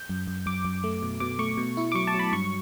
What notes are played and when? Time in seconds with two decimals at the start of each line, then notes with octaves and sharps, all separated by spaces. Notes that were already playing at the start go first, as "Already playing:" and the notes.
Already playing: G6
0.09 F#2
0.27 F#2
0.46 F#2 D6
0.65 F#2
0.84 A3
1.02 B2
1.20 B2 D6
1.39 A3 C#6
1.57 B2
1.77 E4
1.92 D6
1.95 F#3 C#6
2.07 A5
2.14 F#3
2.19 B5
2.33 G2 C#6